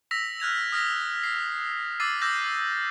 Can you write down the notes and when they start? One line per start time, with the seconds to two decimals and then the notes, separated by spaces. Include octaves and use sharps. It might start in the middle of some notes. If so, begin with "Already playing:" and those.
0.11 E6 A#6 B6 F7
0.40 F6 F#6 G#6 F7
0.72 D#6 F6 A#6 B6
1.24 C7
2.00 D6 E6 A6 C7 D#7
2.21 D6 E6 F6 G6 A#6